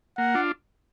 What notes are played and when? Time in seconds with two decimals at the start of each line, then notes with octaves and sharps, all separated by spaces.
0.17 A#3 F#5
0.35 D4 F4